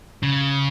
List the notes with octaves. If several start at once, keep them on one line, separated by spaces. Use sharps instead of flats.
C#3